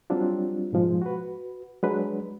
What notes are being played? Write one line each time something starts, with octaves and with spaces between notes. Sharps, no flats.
F#3 G3 C4 D4 F4
G#2 B2 F3 G#3
F#4 B4
F#3 G#3 D4 B4